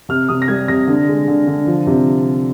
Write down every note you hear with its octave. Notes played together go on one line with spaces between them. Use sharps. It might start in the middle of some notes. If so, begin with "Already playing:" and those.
C3 F6
C3 D#6
A#6
G3 G#6
C3 A#6
D3
G#3
D3
D3
F3
C3